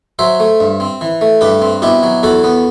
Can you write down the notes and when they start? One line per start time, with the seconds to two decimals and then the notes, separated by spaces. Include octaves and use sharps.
0.19 F#3 C5 E5
0.40 A3
0.60 G2
0.80 C4
1.01 E3
1.21 A3
1.41 G2 G4 B4
1.62 C4
1.82 B2 E4 G4
2.03 F#3
2.23 E2 F#4 A4
2.44 B3